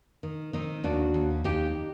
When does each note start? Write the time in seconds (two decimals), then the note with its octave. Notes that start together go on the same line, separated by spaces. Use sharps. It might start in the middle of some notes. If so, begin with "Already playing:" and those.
0.23 D#3
0.53 D#3 C4 D#4
0.84 D#2 D4 F#4
1.14 D#2
1.44 D#2 D#4 G4